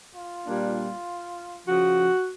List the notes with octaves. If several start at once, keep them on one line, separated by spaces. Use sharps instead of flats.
F4
A#2 G3 A#3 D4
C#3 F3 F#4